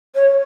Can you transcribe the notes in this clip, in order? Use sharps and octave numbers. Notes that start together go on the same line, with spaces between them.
C#5